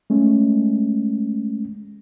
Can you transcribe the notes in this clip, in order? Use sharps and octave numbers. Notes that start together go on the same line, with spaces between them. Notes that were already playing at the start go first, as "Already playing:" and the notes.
G#3 A3 C#4